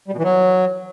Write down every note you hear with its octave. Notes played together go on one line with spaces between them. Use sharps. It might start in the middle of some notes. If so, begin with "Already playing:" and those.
G3
B2
E3
F#3